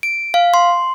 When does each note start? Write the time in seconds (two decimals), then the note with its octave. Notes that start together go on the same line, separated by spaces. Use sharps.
0.03 D7
0.34 F5
0.54 C6